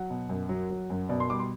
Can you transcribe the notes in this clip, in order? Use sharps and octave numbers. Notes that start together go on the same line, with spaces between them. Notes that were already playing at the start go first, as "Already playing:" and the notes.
Already playing: F#3 F#5
B2
F#2
F#3
F#3
F#2
B2 D5
C6
G3 D6
C6